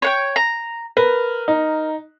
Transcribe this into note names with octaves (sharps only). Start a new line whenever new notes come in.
C#5 F#5 G5
A#5
A#4 B4
D#4